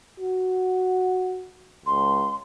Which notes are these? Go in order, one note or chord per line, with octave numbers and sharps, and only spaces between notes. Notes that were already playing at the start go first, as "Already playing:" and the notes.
F#4
C#2 C6